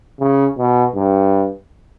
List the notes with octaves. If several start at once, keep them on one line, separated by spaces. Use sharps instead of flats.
C#3
B2
G2